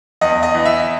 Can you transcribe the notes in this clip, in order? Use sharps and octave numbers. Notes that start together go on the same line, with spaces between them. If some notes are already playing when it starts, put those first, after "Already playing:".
E2 D#5
D#5
E3
E5